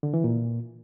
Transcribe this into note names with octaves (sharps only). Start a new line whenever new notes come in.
D3
E3
A#2